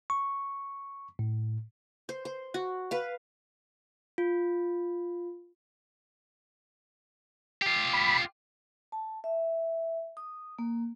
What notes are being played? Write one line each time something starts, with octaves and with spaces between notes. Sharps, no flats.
C#6
A2
C5
C5
F#4
B4 F5
F4
F4 G4
B5
A5
E5
D#6
A#3